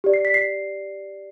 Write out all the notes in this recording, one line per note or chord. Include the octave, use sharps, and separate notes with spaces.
G4 D5
C7
B6
C7